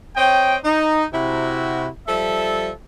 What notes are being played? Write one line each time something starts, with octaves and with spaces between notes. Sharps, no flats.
C4 C#5 D#5 G5
D#4
C3 E4 F#4
F3 G3 A4 E5